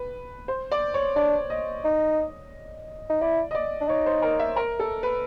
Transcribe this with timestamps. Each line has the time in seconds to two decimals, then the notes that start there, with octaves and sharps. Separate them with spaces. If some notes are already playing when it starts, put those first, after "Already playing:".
Already playing: B4
0.48 C5
0.72 D5
0.94 C#5
1.16 D4 D5
1.50 D#5
1.85 D#4
3.10 D#4
3.21 E4 D5
3.51 D#5
3.55 D5
3.80 D4
3.88 D#4 C#5
4.06 C5
4.22 A#4
4.39 E5
4.56 A#4
4.79 A4
5.03 B4